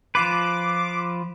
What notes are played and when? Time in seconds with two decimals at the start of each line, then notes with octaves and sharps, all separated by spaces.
0.15 F3 F4 B4 D6